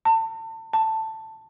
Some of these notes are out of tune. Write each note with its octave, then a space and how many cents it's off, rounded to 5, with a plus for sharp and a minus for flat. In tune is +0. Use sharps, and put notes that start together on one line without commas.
A5 +30
A5 +10